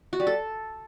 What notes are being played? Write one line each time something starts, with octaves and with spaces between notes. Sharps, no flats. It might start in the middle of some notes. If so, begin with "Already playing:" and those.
F#4
G3
A4